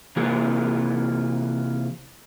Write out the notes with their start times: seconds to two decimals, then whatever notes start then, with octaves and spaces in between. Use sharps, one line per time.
0.16 C3 E3 A#3 F4 G#4